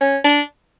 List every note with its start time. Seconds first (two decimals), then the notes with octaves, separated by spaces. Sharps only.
0.01 C#4
0.24 D4